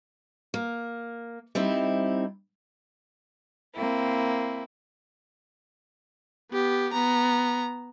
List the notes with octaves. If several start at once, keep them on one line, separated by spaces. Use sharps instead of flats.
A#3
G3 C4 D#4 E4
A#3 C4 E4
B3 G4
B3 A#5